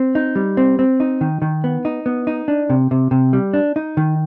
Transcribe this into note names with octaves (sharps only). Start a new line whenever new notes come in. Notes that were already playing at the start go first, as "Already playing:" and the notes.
Already playing: C4
D#4
G3
C4
C4
D#4
D#3
D#3
B3
D#4
B3
D#4
D4
C3
C3
C3
G3
D4
D#4
D#3